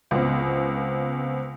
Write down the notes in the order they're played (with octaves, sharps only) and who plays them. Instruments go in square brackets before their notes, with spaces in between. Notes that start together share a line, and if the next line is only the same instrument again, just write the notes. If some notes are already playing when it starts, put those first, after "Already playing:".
[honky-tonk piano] C#2 B3 C4